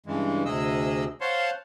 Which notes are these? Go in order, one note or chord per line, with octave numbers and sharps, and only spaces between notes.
G2 C#3 E3 G#3
D2 C3 G#4 D#5 E6
C5 C#5 F5 F#5 A5 C6